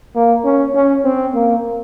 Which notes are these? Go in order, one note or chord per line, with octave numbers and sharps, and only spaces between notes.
A#3
C#4
C#4
C4
A#3